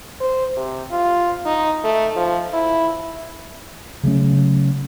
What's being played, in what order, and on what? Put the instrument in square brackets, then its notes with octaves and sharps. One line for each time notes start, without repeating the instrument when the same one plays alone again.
[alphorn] C5
C3
F4
D#4
A3
F3
E4
[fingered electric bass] C#3 F#3 A3 C#4